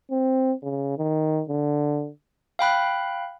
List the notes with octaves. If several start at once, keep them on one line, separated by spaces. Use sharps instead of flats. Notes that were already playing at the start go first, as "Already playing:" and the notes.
C4
C#3
D#3
D3
F5 G5 B5 F#6